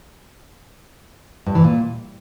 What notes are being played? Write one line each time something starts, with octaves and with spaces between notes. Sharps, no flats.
G2
E3
A#2